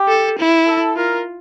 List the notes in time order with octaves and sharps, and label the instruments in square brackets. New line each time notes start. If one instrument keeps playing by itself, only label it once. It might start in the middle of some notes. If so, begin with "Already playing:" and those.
Already playing: [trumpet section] G4
[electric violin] A4
E4
[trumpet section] A4
[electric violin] F4 [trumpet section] A#4